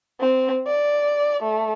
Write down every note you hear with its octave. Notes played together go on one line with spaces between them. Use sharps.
C4
D5
A3